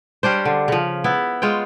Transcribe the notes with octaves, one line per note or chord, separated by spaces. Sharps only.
G3 C#4 D4 C5
D3
C#3 F3
B3 E4
G#3 F4 C#5 G5